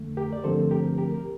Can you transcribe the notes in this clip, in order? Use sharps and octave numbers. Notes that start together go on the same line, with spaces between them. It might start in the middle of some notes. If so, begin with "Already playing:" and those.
Already playing: F2 D3 A3
G4 A#4
D5
G2 D3 F3 A3 C4 A4 C5
G4 A#4
G4 A#4
A#4